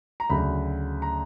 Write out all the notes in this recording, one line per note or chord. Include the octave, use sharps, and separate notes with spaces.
A#5
D2 C#3 F#3 B5
A#5